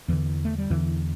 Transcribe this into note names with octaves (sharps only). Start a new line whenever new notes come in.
E2 D3 E3
A3
G3
E2 D3 E3